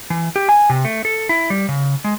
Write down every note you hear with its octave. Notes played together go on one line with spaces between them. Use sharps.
E3
G4
G#5
C3
A3
A4
E4
G3
C#3
G#3